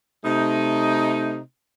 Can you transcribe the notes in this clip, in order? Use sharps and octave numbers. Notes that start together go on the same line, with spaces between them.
C3 A3 D#4